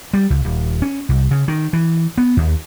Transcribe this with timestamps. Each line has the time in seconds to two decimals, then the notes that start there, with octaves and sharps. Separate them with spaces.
0.13 G3
0.30 C#2
0.45 D#1
0.82 C#4
1.09 C2
1.31 C#3
1.48 D#3
1.73 E3
2.18 B3
2.37 D#2